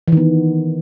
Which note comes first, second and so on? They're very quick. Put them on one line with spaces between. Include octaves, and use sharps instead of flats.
E3 D#3 B3